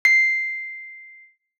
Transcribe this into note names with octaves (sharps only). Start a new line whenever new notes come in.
C7